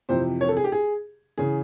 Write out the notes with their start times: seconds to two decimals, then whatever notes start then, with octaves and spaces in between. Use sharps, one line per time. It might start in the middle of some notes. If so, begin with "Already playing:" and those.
0.09 F2 C3 E3 C5
0.41 C#5
0.48 A4
0.57 G#4
0.64 G4
0.72 G#4
1.38 C#3 E3 G#4